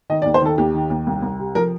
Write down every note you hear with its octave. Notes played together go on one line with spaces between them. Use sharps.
D#3 D#5
D5
D#2
C5
D#3 A4
D#2 G4
D#3
D#2
C2
C2
C3
F3 A#4